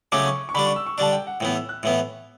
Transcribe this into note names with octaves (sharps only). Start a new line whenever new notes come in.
C#3 F#3 A3 C#4 D6
C#6
C#6
D3 G3 D4 B5
C#6
E6
C#6
D3 G3 D4 A5
G5
F#5
A2 E3 B3 G5
E6
F#6
A2 E3 B3